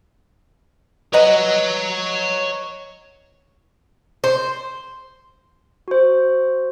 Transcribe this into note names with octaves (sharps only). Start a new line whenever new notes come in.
B4 C#5 D#5 F#5 A#5
C5
F#4 C5